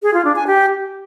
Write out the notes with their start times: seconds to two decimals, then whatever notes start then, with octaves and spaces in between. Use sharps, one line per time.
0.03 G#4
0.14 F4
0.25 D4
0.36 G#5
0.47 G4